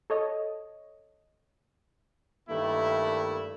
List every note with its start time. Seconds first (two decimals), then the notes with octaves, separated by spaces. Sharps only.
0.10 A4 C#5 D#5
2.50 G2 D#3 A3 A#3 E4